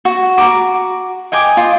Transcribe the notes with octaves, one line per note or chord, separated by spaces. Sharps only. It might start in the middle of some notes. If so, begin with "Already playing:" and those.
F#4
F#4 A#5 D6
D#5 G5 G#5 D6
F4 D#6